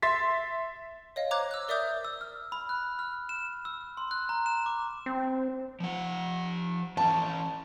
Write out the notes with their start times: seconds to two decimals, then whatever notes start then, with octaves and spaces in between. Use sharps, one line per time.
0.02 E5 C6 A6 B6
1.16 C#5 D#5 F5
1.31 C5 A#5 D6 F#6 G#6
1.51 E6 F#6
1.68 A#4 D5 E5 D6 D#6 G6
2.05 E6
2.21 F6
2.52 B5
2.69 F#6
2.99 F6
3.29 E7
3.65 E6
3.97 C6
4.11 F#6
4.29 A#5
4.46 E7
4.66 D6
5.06 C4
5.80 F3 F#5
6.97 E3 C#4 A5